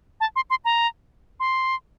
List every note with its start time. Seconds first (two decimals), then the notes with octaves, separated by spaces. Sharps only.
0.20 A5
0.36 C6
0.50 C6
0.65 A#5
1.40 C6